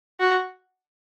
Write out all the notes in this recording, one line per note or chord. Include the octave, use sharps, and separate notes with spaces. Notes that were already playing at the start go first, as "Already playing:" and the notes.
F#4